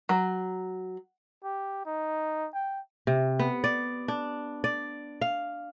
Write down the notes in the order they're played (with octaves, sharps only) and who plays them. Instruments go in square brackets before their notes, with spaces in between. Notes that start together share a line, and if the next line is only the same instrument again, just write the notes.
[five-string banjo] F#3
[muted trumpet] G4
D#4
G5
[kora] C3
B3
D5
D4
D5
F5